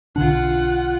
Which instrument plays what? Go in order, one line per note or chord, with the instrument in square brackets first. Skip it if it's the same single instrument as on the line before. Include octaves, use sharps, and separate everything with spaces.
[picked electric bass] B1 D3 D4 [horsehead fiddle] F4 F#5